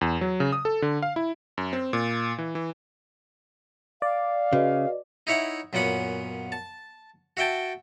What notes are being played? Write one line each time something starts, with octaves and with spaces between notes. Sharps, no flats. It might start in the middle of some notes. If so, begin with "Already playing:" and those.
E2
F#3
C#3
D#6
A4
D3
F5
E4
F#2
C4
A#2
E3
E3
D5 F5
C#3 F#4 B4 D#5
D#4 E4 C#5 E5 F#5
F#2 A#2 B3 C#4 F#5 B5
A5
F#4 E5 G5 A5